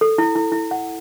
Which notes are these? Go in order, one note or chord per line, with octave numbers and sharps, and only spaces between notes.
A4
E4
E4
E4
F#5